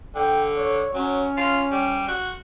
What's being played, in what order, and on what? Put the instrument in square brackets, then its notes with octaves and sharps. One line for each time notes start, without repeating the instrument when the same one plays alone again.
[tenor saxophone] D3 [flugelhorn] G5
[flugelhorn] C#5
[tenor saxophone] F#3 [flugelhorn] C#4
[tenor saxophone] F4
G3
F#4